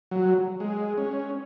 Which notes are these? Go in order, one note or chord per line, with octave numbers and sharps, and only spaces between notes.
F#3
G#3
C#4